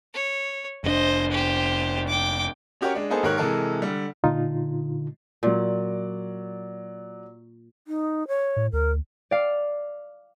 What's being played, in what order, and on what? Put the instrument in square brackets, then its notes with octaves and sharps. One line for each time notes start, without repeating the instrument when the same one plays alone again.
[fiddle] C#5
[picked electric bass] F1 B2 D4 [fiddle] C5 D#5
[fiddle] G4 C5
G5 D6
[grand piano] C#4 F#4 G4 A#4 C#5
G#3 D4
A#3 B3 D#4 G#4 A4 C5
G#2 D#3 G4 A#4 C#5 F#6
C3 E3 G#3 A4 A#4
D3 G3
[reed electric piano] A#2 D#4 F4 [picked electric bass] D3 G#3
[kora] A#2 [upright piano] F#3 D5
[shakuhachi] D#4
C#5
[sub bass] A2
[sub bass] D2 [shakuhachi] A#4
[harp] D5 F5